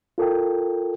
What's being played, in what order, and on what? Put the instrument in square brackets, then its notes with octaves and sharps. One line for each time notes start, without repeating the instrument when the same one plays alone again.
[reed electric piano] F4 A4 A#4 G5